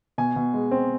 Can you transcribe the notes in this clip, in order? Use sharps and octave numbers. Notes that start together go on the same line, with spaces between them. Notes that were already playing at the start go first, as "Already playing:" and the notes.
B2 G#5
B2
G#3
C4